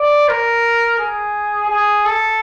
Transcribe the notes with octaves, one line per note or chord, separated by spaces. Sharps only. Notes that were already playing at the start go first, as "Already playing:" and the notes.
Already playing: D5
A#4
G#4
G#4
A4